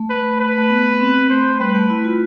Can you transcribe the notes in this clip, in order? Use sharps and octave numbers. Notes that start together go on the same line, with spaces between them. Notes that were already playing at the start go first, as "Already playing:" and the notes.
Already playing: A3
B4
B4
A3
B3
B3
C4
A3 C5
G3 B4
A3
E4
F4